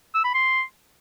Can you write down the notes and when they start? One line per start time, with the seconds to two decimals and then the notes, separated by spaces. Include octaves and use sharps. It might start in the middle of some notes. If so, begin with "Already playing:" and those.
0.15 E6
0.24 B5
0.34 C6